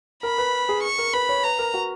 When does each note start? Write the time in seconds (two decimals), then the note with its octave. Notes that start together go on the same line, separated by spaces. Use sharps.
0.23 A#4 B5
0.38 B4
0.69 G#4
0.83 C#6
0.98 A#4
1.13 B4 B5
1.29 C#5
1.43 B4 A#5
1.59 A#4
1.74 F#4